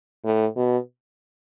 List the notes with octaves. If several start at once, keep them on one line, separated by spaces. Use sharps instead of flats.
A2
B2